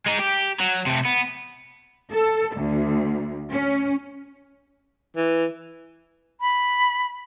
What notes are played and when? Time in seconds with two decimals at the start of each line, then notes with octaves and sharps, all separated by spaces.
0.07 G#3 D#4
0.19 G4
0.60 F#3
0.86 C3 A3
1.05 B3
2.11 A4
2.55 D2
3.50 C#4
5.17 E3
6.41 B5